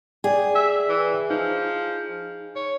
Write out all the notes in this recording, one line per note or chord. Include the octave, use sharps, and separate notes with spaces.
G#4 D5 G5 G#5
E5
E3
F3 D#4
C#5